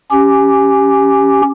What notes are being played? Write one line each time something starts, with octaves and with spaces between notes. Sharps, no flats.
C#4 G4